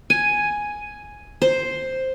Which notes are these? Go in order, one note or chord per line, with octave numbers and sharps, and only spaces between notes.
G#5
C5